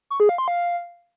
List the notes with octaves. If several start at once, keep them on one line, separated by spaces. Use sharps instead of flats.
C#6
G#4
F5
C6
F5